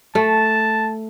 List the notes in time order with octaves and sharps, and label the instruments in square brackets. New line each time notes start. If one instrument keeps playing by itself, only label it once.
[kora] A3 [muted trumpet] A5